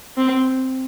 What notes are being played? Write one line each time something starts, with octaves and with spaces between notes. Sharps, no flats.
C4